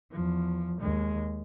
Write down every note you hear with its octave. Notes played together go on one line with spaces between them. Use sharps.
E2 F3
D#2 G#3